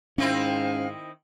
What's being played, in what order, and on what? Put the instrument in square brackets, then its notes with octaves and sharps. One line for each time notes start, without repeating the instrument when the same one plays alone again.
[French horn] G#2 [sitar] D#3 C4 E4 [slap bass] C#4 [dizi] F5